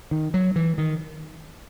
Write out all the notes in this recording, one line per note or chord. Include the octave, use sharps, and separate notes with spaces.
D#3
F#3
E3
D#3